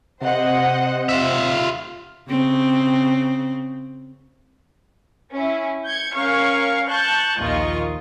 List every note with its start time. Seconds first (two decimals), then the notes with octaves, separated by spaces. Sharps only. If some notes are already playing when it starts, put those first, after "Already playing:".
0.22 C3 C5 D#5 F#5
1.09 F4 E5
2.28 C#3 C4
5.32 C#4 E4
5.85 G6 G#6 C#7
6.15 C#4 A#4 C#5 F5 C#6
6.89 A5 C#6 F#6 G6
7.39 A#1 D#2 D#3 F4 D#5 C#6